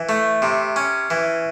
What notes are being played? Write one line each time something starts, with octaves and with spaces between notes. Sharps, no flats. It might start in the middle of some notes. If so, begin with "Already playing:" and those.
Already playing: E3
A3
C3
C#4
E3